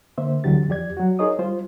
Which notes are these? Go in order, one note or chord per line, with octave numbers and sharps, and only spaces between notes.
D3 A#3 C5 E5
D2 D3 E3 F#3 G4 A6
E2 F3 G4 D5 G#6
F#3 F#4
D#4 G#4 A#4 C#5 D#5 D#6
G3 F4 C5